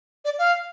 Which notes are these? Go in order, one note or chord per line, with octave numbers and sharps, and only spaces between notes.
D5
F5